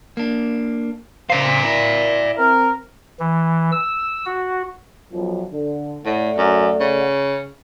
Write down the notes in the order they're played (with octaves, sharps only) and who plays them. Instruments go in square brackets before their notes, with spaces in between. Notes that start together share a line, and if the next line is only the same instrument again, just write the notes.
[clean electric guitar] A#3 D4
[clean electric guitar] C#3 C5 [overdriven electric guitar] D5 F5
[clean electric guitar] E4
[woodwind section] C4 A#4
[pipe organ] E3
E6
F#4
[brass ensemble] B1 F#2 F3
D3
[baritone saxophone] A2 [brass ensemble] A3 D5 F#5
[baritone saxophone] F#2
C#3